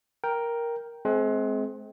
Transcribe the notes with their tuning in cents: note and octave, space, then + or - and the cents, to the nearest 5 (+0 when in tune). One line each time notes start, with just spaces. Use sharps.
A#4 +5 G5 +0
G#3 +35 C4 +0